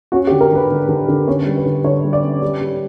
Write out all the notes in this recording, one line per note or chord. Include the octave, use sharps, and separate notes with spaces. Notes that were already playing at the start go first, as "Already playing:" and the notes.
C#4 F#4
G4
D3
A#4
D3 B4
D3
D3
D3
C#4 C#5
G3
B4
D3
D3 C#5
G3
D5
C#4
G3
G3